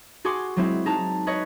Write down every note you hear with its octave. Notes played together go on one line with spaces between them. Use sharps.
F#4 G#4 G#5 C6 D6
F#3 G#3 C4 E4
D#4 G#4 A5 A#5
B4 C#5 D#5